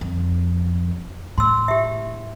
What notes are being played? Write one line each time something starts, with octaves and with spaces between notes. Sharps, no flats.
F2
A2 C6 E6
G4 E5